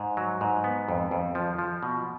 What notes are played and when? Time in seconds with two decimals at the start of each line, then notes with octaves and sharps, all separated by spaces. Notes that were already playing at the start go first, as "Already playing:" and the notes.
Already playing: G#2
0.17 F#3
0.41 G#2
0.64 B3
0.89 F2
1.11 F2
1.35 F3
1.59 F3
1.83 B2